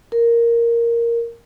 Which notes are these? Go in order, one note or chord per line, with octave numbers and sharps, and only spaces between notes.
A#4